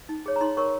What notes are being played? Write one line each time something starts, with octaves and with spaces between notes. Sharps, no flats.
D#4
G#4 C#5
A#5
D#4 C6
A#4 C#5 C#6